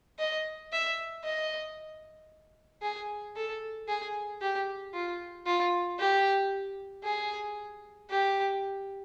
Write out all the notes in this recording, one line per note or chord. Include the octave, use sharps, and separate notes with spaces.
D#5
E5
D#5
G#4
A4
G#4
G4
F4
F4
G4
G#4
G4